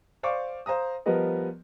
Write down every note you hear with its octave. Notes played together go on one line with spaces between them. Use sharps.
C5 D5 F5 C#6 D6
C5 F5 A#5 D#6
F3 G3 B3 A#4 B4 D#5